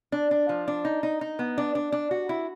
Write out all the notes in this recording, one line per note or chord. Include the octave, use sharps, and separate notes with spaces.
D4
D4
F3
D4
D#4
D#4
D#4
B3
D4
D4
D4
F#4
E4